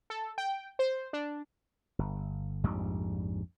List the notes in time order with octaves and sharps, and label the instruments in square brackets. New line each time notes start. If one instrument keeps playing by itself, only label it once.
[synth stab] A4
G5
C5
D4
[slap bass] G1
A#1 F2 G#2 G3